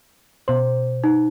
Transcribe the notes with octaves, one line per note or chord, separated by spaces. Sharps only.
B2 C5
D#4